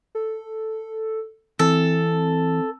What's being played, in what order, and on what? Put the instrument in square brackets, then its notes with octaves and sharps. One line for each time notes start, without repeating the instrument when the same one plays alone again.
[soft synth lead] A4
[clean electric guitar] E3 [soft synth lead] C4 [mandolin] A4